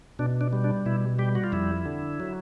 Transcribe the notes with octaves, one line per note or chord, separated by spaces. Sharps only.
B2 D4
D4
G3
D4
B2 E4
G3 G4
F#4
F4
F2 E4
D3
F#3